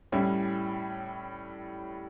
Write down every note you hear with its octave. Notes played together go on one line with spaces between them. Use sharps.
A2 G3 C#4 E4